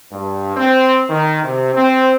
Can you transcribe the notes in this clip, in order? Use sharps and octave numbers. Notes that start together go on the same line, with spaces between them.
G2
C4
D#3
C3
C4